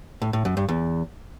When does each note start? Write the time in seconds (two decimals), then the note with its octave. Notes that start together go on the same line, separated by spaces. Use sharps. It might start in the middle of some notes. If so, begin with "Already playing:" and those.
0.22 A2
0.33 A2
0.45 F#2
0.57 G2
0.69 E2